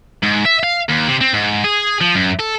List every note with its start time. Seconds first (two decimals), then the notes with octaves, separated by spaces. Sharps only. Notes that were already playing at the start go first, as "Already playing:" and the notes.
0.23 G#2
0.45 E5
0.63 F5
0.89 D#2
1.08 C3
1.21 C4
1.34 G#2
1.64 G#4
2.01 F3
2.15 F#2
2.39 A4